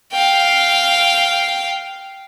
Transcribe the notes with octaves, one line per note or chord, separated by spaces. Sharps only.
F5 G5